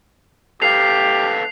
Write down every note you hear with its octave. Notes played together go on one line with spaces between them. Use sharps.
G4 A4 B4 F5 C7 F7